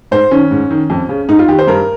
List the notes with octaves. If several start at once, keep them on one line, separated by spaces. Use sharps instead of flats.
G#2 C5
D#3 C#4
G#2
D#3
F2
C#3
G#2 D#4
F4
D#3 G4
C5
G2 A#4